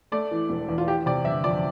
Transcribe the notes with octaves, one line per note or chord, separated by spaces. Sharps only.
A3 D5
E3
E1
E2
F4
E3 G4
C3 D5
G1 E5
F2 D5